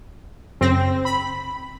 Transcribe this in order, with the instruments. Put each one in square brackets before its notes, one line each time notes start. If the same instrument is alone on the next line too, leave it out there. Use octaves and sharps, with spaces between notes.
[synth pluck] F#2 C#3 A#6 [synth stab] C4
[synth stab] B5